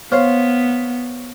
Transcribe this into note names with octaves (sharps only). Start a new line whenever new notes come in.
B3 C5 C#5 F5